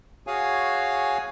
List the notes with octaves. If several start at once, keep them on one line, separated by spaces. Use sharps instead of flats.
F#4 G#4 C#5 F5 G#5